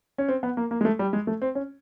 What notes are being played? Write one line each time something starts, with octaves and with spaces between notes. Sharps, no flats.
C#4
C4
B3
A#3
A#3
G#3
A3
G3
G#3
A3
C4
C#4